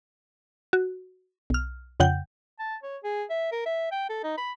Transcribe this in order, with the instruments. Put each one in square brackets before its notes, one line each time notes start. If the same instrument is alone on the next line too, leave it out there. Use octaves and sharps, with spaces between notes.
[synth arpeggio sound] F#4
B1 F6
F2 C#3 F#5 G5 G6
[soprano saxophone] A5
C#5
G#4
E5
A#4
E5
G5
A4
D#4
B5